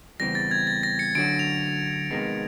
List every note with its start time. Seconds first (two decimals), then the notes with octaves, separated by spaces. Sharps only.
0.20 E2 C#3 E3 G3 C4 A#6
0.35 A6
0.51 G#6
0.67 A6
0.83 A#6
0.99 C#7
1.15 D3 F#3 A3 C#4 F#4 D7
1.39 F7
2.11 F2 C3 D#3 G#3 B3